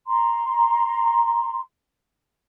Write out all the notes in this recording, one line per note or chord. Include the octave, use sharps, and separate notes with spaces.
A#5 C6